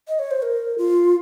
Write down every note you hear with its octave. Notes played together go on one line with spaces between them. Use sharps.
D#5
C#5
C5
A#4
F4